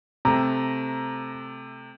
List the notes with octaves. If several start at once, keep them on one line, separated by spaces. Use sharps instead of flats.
C3 A3 A#5